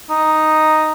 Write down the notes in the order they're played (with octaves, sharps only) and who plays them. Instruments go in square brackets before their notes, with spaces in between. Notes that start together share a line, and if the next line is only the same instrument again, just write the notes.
[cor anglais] D#4